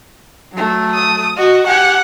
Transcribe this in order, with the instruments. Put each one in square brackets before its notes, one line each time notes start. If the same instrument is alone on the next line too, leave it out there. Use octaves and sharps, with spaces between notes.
[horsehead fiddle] F#3 A3
[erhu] D#6
[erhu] F#4 [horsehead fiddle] D#5
[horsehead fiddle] G4 G#5 [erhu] F#5